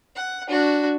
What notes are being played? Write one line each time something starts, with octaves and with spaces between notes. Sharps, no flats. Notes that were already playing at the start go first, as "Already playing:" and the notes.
F#5
D4 F#4